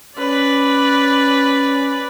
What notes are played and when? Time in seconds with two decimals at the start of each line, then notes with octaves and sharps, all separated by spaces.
0.18 C#4 B4 D5